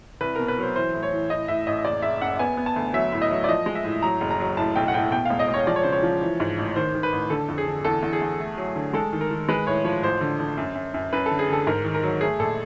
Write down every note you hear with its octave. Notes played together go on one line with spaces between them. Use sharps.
C2 B4
B2 A#4
B4
F#3 C5
E3 C5
A2
C#5
E3
A2 D#5
A2 E5
A1 D#5
F#1 D5
F#1 E5
F#2 F#5
B3 G#5
B3
A5
D2
F#3 E5
A2
D#5
F#3
D5
F3 D#5
G#3
E5
A2
F#3 A#5
F#1
A#5
F#3
A2 A5
B1 G5
F#5
A2 G5
B2 G5
F5
E1
D#5
E1
C#5
F3 D5
C#5
C#3 C5
C#5
F3
E3
G#2
A1
D#3 C5
D#3
B4
A1
D3 A4
F2
G#4
D3
E2 A4
E2
G#4
E2
A3
F#3
D3
G#3 A4
D#3
A#4
D#3
G#3 B4
A2 C#5
F3 C#5
A1 C5
D3
D3
F#2
F#2
F#2
F#2 B4
A4
D3
G#4
D3 A4
G#2 A#4
D#3
A#4
F#3
A3 G#4
A#1 A4